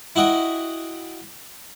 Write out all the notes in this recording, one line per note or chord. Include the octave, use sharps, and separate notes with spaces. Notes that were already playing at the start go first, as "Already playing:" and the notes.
E4 F#4 D#5 G5